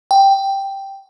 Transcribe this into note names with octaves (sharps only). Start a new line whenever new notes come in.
G5